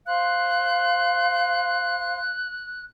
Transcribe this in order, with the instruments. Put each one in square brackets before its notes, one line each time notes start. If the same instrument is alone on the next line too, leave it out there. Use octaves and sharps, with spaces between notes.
[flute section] C5 F5 C6 [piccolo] F#6